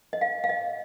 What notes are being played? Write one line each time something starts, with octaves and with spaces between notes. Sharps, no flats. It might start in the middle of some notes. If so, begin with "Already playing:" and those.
D#5
F5
F5
D#5